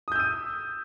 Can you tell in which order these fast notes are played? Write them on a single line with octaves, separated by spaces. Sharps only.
D#6 G6 E6 D#7